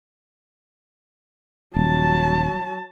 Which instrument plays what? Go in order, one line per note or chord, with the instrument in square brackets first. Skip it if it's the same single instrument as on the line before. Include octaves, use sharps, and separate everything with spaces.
[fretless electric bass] D#1 [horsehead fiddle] F#3 A5